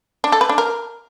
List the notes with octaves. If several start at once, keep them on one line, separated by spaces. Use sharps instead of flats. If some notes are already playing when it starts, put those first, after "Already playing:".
D4
A4
B4
D4
A#4